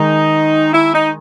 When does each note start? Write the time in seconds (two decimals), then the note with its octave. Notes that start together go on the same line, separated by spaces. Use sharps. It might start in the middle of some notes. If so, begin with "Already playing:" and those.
Already playing: D#3 G#3 D#4
0.73 E4
0.93 D#4